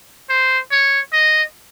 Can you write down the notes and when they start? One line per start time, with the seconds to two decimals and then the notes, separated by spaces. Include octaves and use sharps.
0.29 C5
0.71 C#5
1.13 D#5